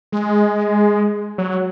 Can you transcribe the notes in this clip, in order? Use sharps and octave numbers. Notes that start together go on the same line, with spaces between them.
G#3
F#3